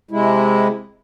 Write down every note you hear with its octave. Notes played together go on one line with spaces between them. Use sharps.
C3 G#3 E4